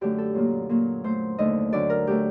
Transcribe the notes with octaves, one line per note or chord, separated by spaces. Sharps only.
F#2 D3 F#3 A3 G4
A4
A#2 F#3 A#3
A#2 F#3 A#3
A#2 A3 C5
D#2 D3 A3 D#5
D2 D3 F#3 D5
A#4
F#3 A3 G4